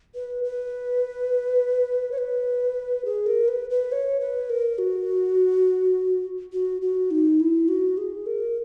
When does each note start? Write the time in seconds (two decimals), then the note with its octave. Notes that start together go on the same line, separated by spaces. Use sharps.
0.15 B4
0.44 B4
2.12 C#5
2.18 B4
3.05 G#4
3.26 A#4
3.48 B4
3.70 B4
3.92 C#5
4.21 B4
4.50 A#4
4.78 F#4
6.53 F#4
6.82 F#4
7.11 D#4
7.40 E4
7.68 F#4
7.98 G#4
8.26 A#4